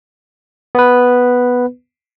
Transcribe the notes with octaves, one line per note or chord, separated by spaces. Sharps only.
B3 B4